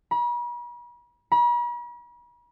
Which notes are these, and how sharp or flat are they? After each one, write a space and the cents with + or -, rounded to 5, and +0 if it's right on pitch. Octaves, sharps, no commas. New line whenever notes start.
B5 -45
B5 -45